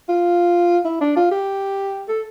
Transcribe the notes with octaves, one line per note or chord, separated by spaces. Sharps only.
F4
E4
D4
F4
G4
A4